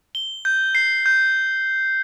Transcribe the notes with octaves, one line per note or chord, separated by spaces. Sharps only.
G7
G6
C7
G6